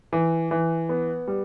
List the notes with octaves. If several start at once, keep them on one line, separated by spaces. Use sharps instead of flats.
E3
E3
B3
G3